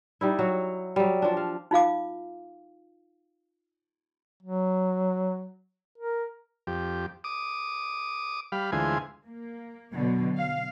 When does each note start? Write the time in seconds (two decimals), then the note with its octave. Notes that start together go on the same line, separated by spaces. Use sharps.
0.21 G3 D#4 E4
0.39 F#3 F#4
0.96 F#3 G3
1.22 F3 D4
1.37 F5
1.71 D#4 F4 F5 D6
4.43 F#3
5.98 A#4
6.67 F2 G4
7.24 D6 D#6
8.52 G3 F5 B5
8.72 D2 E3 G#3 F4 C5 G#5
9.26 A#3
9.93 B2 D3 F#3
10.36 F5